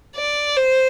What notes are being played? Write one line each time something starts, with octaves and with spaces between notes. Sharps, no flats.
D5
C5